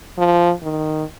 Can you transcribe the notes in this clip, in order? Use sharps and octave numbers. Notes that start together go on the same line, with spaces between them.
F3
D#3